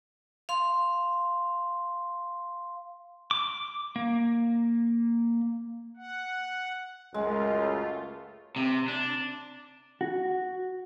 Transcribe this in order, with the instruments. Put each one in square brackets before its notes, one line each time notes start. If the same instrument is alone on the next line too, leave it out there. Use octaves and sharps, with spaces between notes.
[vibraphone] F5 C6
[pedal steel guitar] D6
A#3
[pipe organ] F#5
[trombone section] C#2 F#2 [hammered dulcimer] G#3 [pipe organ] A3 F4
[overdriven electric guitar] C3
D4
[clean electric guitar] F#4